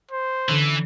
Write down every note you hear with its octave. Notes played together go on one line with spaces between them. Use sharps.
C5
D3 E3 C#4